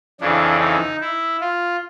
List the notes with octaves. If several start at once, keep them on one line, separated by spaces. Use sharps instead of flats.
F2 C#3 E3 D4
D#4
E4
F4